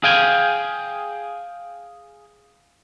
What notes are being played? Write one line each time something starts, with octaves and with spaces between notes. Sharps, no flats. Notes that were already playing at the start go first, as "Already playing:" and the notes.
G#4 F5 G5 G#5